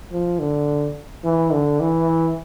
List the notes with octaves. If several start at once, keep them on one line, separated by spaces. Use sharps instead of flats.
F3
D3
E3
D3
E3